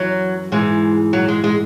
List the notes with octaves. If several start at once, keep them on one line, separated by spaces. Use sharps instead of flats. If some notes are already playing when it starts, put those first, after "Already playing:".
Already playing: F#2 E3 F#3
G#2 E3 G#3
F#3
G#3
G#3